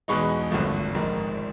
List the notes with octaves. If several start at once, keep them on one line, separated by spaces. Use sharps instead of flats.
E2 B2 G#3 B3 D#4 B5 C#6
G#1 G2 D3 F3 A3
A#1 G#2 D#3